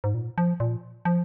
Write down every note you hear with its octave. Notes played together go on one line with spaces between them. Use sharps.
G#2
A#2
F3
A#2
F3